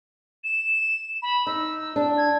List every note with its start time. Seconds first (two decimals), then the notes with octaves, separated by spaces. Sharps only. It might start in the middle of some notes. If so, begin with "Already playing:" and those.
0.44 E7
1.22 B5
1.47 D#4 E6
1.96 D4
2.18 G#6